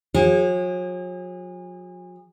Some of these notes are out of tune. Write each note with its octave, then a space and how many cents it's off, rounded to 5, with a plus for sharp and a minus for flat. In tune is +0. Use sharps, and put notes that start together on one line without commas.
F#3 -45 G#4 -30